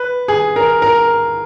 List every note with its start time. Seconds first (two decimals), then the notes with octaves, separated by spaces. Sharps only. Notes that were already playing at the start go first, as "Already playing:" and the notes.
Already playing: B4
0.28 G#4
0.56 A#4
0.82 A#4